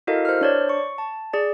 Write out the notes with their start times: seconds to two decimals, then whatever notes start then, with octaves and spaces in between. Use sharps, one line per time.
0.07 E4 F#4 A4 A#4 D#5 F5
0.25 C5 F6
0.41 D4 C#5 D5
0.69 C#6
0.98 A5
1.33 G#4 D5